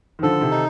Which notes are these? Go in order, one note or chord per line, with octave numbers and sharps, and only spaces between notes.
D#3
D3 F3 A4
C3 D#3
D#4